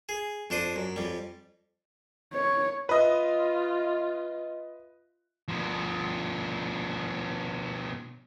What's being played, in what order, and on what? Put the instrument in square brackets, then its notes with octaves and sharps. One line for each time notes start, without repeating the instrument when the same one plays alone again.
[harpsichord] G#4
F2 D4 C5 D#6
F#2
F2 G3
[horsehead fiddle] C#5
[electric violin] F4 [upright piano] B4 D#5 E5
[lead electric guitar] B2 F3